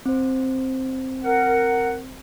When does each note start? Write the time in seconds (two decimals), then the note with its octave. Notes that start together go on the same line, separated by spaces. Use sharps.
0.06 C4 C5
1.24 A#4 F#5